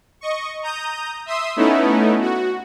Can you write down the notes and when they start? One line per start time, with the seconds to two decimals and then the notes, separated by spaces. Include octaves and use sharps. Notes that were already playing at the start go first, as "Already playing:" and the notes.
0.21 D#5 C#6
0.63 A#5 D#6 G6
1.26 E5 C6 D#6 E6
1.56 A3 B3 C#4 D#4 E4
2.21 F#4